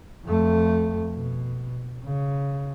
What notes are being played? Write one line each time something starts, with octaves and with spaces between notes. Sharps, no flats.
F2 A3
B2
C#3